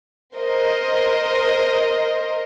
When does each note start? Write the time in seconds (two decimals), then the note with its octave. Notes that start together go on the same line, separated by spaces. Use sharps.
0.35 A#4 C5 D#5